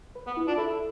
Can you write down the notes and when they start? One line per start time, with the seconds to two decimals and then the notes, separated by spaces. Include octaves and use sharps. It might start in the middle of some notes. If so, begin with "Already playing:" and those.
0.15 B4
0.26 B3 B4
0.37 E4
0.48 D4 F4
0.57 E4 A4